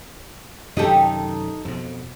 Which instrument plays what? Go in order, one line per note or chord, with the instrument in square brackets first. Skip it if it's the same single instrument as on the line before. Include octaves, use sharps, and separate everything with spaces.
[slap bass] F#2 C3 D#3 [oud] D#4 G4 A4
[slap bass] F2 B2